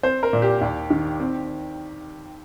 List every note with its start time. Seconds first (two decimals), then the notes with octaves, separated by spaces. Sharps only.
0.03 C4 C5
0.23 A#4
0.33 A#2
0.42 G4
0.61 D#2
0.90 D#3
1.20 C4